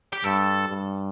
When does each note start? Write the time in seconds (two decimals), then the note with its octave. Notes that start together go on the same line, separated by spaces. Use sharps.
0.13 G4
0.24 G2 A4
0.69 G2